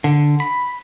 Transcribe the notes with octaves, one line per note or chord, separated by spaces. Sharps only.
D3
B5